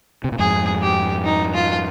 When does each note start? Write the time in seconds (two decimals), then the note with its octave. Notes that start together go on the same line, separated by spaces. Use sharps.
0.24 C3
0.32 A#2
0.39 F2 G#2 G#4
0.82 G4
1.24 D#4
1.54 F4